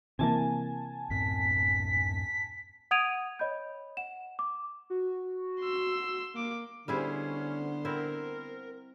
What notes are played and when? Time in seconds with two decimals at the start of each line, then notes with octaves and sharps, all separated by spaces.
0.19 C3 E3 A#3 G#5 A5
1.10 F#2 A2 C4 B6
2.91 F#5 D#6 G#6 D7 D#7 F7
3.39 C#5 D#5 B5 G6
3.97 F#5 E7
4.39 D6
4.90 F#4
5.61 C6 E6
6.35 A#3 D6
6.88 D3 G3 B3 C#4 E4 G#4 C5
7.85 C4 E4 A#4